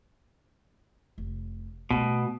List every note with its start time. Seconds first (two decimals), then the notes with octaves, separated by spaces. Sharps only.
1.18 F1
1.90 B2 G3 A3